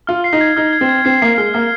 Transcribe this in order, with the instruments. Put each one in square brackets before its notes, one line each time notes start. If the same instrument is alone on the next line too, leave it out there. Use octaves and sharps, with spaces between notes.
[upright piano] F4 [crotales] F6
[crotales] C7
[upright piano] D#4
[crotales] G#6
[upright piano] D#4 [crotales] F6
[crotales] G#6
[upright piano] C4
[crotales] G#6
[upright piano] C4 [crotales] C7
[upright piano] A#3 [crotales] C7
[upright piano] G#3 [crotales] F6
[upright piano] A#3 [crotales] F6